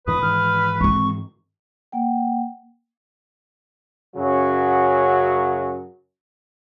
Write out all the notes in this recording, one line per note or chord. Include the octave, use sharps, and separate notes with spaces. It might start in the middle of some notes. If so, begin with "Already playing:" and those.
E2 A2 D#3 B4 D#6
G#2 D#3 E3 F6
G#3 C4 C#6
A#3 F#5 G5
F#2 C#3 F#3 F#4